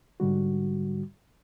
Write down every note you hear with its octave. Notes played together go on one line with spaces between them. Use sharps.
G#2 D3 G3 F#4